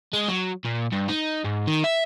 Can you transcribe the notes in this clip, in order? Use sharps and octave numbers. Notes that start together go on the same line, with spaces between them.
G#3
F#3
A#2
G2
D#4
G#2
D#3
E5